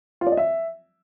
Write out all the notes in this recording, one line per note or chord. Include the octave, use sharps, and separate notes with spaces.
F4
D5
D#5
E5